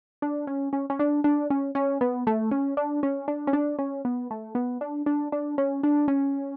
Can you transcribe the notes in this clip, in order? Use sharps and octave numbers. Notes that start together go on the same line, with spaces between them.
D4
C#4
C#4
C#4
D4
D4
C#4
C#4
B3
A3
C#4
D4
C#4
D4
C#4
D4
C#4
B3
A3
B3
D4
D4
D4
C#4
D4
C#4